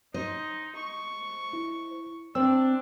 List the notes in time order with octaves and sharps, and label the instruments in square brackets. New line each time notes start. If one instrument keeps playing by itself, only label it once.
[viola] D#4 [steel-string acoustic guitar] C5 D#5
[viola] C#6
[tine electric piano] E4
[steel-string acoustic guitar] C4 [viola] D4 [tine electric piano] C5 G5 E6